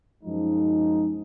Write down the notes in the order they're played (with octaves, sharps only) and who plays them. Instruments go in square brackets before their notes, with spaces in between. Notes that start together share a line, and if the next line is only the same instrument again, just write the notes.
[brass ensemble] F#2 F3 G#3 D#4